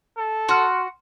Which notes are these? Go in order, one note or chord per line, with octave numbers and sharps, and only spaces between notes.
A4
F#4 C6 F6